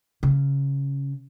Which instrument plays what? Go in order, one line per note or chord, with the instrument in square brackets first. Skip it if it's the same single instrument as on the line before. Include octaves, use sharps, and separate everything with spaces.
[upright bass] C#3